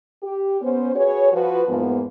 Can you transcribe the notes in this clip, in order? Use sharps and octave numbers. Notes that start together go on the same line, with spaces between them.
G4
B3 C#4 C5
F#4 G#4 B4 C#5
F3 F#4 B4
E2 G#2 F3 A#3 B3